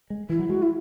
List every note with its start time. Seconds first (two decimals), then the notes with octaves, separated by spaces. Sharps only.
0.10 G#3
0.29 E3 E4
0.39 F#3
0.49 G#3 F#4
0.62 E4